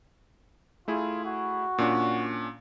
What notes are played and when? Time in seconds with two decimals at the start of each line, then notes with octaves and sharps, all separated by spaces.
0.88 A3 E4 F4 G#4
1.25 F#4
1.78 A#2 C#4 D4